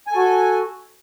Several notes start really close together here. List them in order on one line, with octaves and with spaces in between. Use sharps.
G#5 A4 F#4